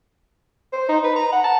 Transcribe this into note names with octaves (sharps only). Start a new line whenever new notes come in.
C5
D#4
B4
A#5
F#5
A5